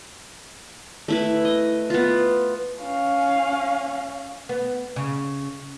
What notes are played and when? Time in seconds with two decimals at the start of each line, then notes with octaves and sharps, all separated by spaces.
1.08 A3 E4 B4
1.45 D#5
1.90 B3 F4
2.81 C#4 F5
4.49 B3
4.96 C#3